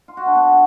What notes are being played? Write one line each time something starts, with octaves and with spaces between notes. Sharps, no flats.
F4
F#4
D4
B3